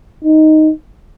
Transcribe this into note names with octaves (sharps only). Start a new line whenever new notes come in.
D#4